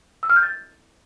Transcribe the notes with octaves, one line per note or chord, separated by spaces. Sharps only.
E6
F6
G6
A6